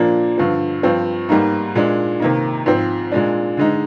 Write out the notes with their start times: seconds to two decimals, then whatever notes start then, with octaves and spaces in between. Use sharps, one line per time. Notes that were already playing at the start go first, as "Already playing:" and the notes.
Already playing: A#2 F3 A#3 D4
0.38 G2 D3 F3
0.83 G2 F3 C4
1.29 G#2 G3 A#3 D#4
1.75 A#2 G#3 D4
2.20 C3 D#3 A#3 D#4
2.66 G#2 F3 C4
3.12 A#2 G#3 D4
3.57 D3 G#3 D#4